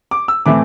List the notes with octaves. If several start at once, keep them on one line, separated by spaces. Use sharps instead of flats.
D6
E6
A2 E3 A3 C4 E4 D6